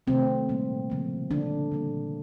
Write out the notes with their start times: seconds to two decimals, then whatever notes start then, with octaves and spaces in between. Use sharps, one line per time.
0.07 C3 D#3 F#3 A3 C4
0.49 A#2 G3 A#3
0.90 C#3 F3 A#3
1.30 A#2 D3 G3 A#3 D4
1.72 A#2 G3 A#3